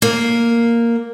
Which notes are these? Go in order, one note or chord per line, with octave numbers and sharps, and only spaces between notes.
A#3